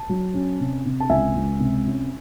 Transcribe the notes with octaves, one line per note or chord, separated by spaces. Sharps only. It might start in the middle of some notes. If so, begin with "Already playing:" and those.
Already playing: A5
F#3
C#4
C3
C3
A5
C#2 E5 G#5
C#2
C3
C#4